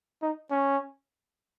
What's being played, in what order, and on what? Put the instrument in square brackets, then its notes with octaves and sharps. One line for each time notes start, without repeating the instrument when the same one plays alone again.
[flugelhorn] D#4
C#4